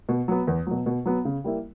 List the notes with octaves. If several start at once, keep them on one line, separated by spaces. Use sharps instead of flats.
B2
F#3 B3
E2
B2 F#3
B2
F#3 B3
C#3
G3 A#3 E4